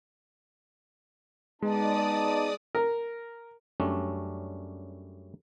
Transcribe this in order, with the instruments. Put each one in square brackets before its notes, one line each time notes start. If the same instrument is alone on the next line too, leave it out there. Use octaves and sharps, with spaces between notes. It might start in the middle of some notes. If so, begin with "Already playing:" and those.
[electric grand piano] G#3 [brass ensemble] B3 D#4 A5 [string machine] D5 D#6
[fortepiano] A#4
[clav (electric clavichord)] F#2 G3 A3 C#4 D4